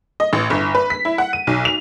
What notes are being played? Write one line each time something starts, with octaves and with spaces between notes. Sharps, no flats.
D#5
A1
G1
B4
B6
E4
F#5
D#7
B1
F7